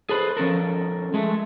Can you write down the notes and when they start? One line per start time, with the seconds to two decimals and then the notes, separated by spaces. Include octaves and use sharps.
0.09 G#4 A4 B4 C5
0.37 F3 C#4 A4 A#4
1.14 G#3 A3